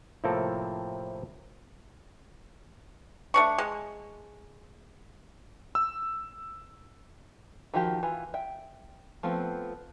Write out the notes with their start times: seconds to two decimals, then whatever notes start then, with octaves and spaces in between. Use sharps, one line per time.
0.24 A2 C3 F3 A#3 C4 A4
3.34 A3 D4 C#6
3.58 G#3
5.75 E6
7.74 D#3 F3 F#4 G4
8.03 E3 F4
8.34 E5 G5
9.23 F3 A3 B3 C4